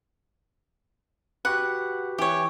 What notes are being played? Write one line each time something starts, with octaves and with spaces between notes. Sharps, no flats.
F#4 G4 B4 F#5
E3 G4 C#5